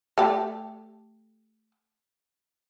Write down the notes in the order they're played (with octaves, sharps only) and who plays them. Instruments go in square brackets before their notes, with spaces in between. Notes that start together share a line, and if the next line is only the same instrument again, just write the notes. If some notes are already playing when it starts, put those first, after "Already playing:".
[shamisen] A3 G4